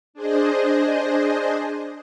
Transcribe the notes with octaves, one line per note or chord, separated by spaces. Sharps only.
D4 G#4 C5 D#5